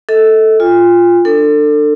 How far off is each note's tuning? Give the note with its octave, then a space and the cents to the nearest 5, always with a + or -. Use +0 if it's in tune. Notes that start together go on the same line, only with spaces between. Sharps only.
A4 +0 D#5 +45
F4 +0 G#5 -45
D4 +25 A4 +30